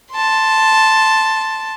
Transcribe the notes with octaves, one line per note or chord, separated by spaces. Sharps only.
A5 C6